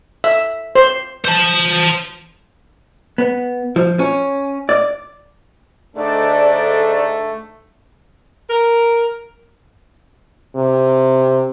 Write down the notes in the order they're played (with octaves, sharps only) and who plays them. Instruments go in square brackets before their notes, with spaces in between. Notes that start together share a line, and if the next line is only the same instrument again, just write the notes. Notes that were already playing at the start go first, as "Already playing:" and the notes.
[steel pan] E5
C5
[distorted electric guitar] C5 A5
[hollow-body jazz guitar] B3
F3
C#4
D5
[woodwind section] G#2 D3 [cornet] A3 [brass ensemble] D4 A4 [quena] D5
[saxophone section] A#4
[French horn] C3